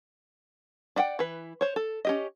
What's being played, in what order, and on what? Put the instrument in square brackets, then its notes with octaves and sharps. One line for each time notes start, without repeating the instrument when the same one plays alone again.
[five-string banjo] D4 D5 F#5 G5
E3 B4
C5 C#5
A4
C#4 G4 D#5